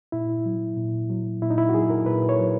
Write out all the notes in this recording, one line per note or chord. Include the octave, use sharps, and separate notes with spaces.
A#2 E4
F#3
A#2
F#3
A#2 E4
D#4
E4
F#4
F#3 G#4
A#4
A#2 B4
C#5
F#3